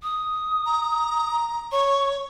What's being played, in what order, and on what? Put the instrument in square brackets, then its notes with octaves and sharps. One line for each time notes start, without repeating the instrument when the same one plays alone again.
[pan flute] D#6
[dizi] A#5
[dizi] C#5 [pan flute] C#6